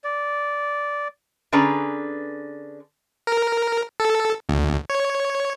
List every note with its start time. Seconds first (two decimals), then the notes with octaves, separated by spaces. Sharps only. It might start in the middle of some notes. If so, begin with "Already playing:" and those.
0.04 D5
1.52 D3 C#4 G#4 B4 D5 A#5
3.27 A#4
4.00 A4
4.49 D2
4.90 C#5